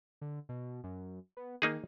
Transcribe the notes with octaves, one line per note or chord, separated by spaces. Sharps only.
D3
B2
F#2
B3
D#3 A#3 D#4 G#4